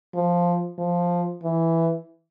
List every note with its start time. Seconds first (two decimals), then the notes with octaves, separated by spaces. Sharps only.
0.15 F3
0.78 F3
1.43 E3